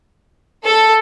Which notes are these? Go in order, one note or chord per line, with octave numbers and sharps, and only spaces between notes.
A4